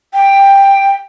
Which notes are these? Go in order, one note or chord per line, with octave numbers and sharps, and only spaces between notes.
G5